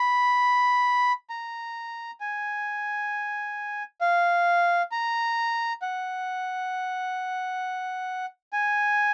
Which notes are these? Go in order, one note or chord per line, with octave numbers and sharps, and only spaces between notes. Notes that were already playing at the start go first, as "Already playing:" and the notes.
Already playing: B5
A#5
G#5
F5
A#5
F#5
G#5